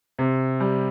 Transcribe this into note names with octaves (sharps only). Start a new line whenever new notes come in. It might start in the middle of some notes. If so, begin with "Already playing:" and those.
C3
G3